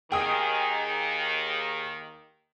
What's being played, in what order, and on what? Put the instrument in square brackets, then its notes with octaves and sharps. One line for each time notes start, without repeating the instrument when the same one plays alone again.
[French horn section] D#2 D#3 [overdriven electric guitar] G#4 [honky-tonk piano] G5 D#6